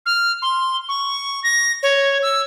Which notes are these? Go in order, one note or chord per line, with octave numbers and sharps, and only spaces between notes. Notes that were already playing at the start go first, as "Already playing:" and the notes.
F6
C6
C#6
A#6
C#5
E6